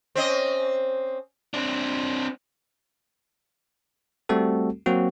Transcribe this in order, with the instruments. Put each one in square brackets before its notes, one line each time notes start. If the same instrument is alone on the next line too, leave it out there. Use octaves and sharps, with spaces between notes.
[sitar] C4 C#4 D#5
[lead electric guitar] C4 D4
[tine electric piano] G3 A3 C4 F#4 A4
F#3 A#3 C4 F#4